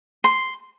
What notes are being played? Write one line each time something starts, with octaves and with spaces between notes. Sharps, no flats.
C6